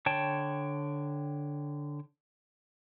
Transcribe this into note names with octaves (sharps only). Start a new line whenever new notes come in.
D3 C#5 G5 A5